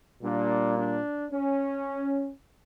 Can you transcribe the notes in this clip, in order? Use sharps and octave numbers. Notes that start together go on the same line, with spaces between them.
A#2 G3 A#3 D4
D4
C#4